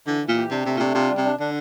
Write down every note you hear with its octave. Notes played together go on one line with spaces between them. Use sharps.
D3 E3
E3
A#2
G4
C3 D4
C3 A3
A#2
C3 D4
C3 F4
G3
C3
D4
D3 D4